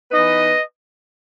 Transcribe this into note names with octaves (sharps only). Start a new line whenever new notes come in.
E3 B3 D#4 B4 D#5